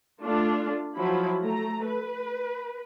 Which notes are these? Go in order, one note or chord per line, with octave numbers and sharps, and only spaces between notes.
A3 D4 F4
F3 F#3 E4 B5
A3 A#5
B4